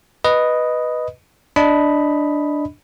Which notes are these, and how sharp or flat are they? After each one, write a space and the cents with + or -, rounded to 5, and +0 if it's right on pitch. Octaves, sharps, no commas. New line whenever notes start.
B4 +0 D#5 +0
D4 +0 D#5 +10 B5 +0